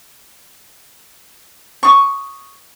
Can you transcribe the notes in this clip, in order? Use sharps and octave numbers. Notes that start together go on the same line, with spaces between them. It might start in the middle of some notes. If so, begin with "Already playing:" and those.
C#6 D#6